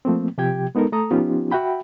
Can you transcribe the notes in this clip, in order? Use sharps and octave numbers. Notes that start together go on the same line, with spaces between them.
F3 A3 A#3 C4
C3 F3 G4 G5 G#6
G#3 B3 D#4 A4 A#4
A3 A4 A#5 D#6
F3 B3 C#4 D#4 F4 G4
F#4 E5 F#5 G5 B5